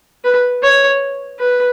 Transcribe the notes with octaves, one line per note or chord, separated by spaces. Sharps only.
B4
C#5
B4